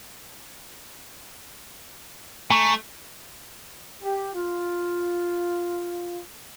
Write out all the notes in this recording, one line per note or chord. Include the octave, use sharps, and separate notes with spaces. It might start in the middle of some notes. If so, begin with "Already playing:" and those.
A3 G#5 A#5 C#6
G4
F4